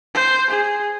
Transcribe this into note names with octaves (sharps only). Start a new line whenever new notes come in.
C5
G#4